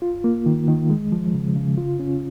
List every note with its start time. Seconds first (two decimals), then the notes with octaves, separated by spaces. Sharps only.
0.02 F4
0.24 A#3
0.46 D#3
0.68 D#3
0.90 G#3
1.12 F3
1.34 C#3
1.56 C#3
1.78 F4
2.00 C#4